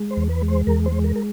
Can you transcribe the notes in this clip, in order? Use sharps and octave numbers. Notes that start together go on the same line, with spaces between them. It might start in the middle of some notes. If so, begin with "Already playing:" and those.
Already playing: G#3
C5
E2
B4
G#3
C5
E2 A#4
C5
G#3
A#4
A#4